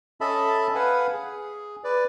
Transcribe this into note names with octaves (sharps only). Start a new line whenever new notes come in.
C#4 A4 D#5 E5 A5 B5
B4 F5 F#5 G#5 B5
G#4
B4 D5